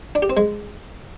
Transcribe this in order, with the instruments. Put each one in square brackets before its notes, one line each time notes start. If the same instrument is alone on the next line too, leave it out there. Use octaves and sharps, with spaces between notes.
[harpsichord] D4
G4
C4
G#3